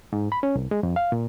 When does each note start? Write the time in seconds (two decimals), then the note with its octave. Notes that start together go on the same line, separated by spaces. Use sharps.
0.13 G#2
0.32 B5
0.43 C#4
0.55 C2
0.71 G#3
0.83 F2
0.96 F5
1.12 A#2